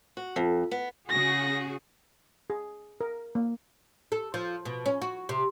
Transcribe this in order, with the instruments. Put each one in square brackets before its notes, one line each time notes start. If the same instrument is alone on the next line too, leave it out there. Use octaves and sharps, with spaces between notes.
[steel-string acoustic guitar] F#4
F2
B3
[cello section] C#3 F#4 G#4 [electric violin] A#6
[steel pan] G#4
A#4
A#3
[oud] A4
F3
B2
C#4
F#4
C3